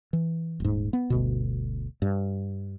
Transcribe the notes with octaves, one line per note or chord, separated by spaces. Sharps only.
E3
D#1 G#2
B3
G1 D2 B2
G2